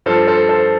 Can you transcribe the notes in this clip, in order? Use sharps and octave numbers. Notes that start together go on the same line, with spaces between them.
G2 F3 A4 C5
A4 C5
A4 C5